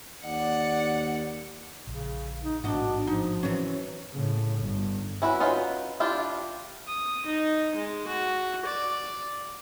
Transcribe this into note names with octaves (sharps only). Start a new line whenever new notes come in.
D#2 D5 F#5
A#1 C#3
D#4
A1 G#2 B2 D4 F#4 D#5
F3 D#4
E3 F#3 C#4
A2 C#3
G1
C#4 E4 F#4 B4
C#4 D#4 F4 F#4 B4
D4 E4 F4 G4
D#6
D#4
G#3
F#4
D5